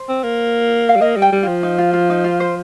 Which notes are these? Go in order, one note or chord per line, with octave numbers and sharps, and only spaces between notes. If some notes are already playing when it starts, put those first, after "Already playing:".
Already playing: C5
C4
A#3
F5
G3
A#3 D#5
G3
G5
G3
F3 F4
D#4
F4
F4
D#4
F4
C5